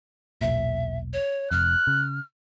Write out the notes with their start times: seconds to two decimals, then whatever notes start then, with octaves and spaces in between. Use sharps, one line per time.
0.41 E1 B1 A#2 E5
1.13 C#5
1.51 F1 F2 F6 F#6
1.87 C#3